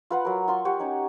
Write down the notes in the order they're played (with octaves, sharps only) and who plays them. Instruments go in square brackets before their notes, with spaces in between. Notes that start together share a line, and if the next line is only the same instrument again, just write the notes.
[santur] F4 B4 F#5 B5
F#3 A#4
F4 C6 C#6
G4 C#5 F#5
C#4 D#4